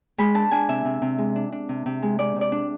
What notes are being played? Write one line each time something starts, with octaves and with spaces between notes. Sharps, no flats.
G#3 B5
D4 A5
D4 G#5
C3 E5
C3
C3
G#3
D4
D4
C3
C3
G#3
G#3 D5
C3
D5
D4